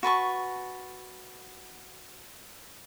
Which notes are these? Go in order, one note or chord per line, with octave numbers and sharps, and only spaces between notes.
F#4 B4 A5 C#6